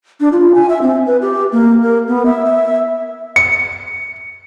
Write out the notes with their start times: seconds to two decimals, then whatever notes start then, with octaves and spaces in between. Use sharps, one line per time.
0.20 D4
0.32 F4
0.55 G#5
0.69 E5
0.82 C4
1.06 B4
1.22 G4
1.52 A#3
1.83 A#4
2.08 B3
2.26 E5
2.45 E5
3.36 C#7